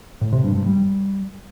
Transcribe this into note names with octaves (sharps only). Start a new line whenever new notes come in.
A2
C3
G2
G2
G3